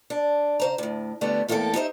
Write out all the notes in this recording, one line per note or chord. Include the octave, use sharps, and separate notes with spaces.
D4
C#3 C5 A#5
D2 A2
D3 G3 A3 B3
E2 A2 A#3 F#4 A4 G5
D#4 G4 C5 E5